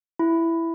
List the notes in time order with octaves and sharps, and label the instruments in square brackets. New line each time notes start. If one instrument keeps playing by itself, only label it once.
[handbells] E4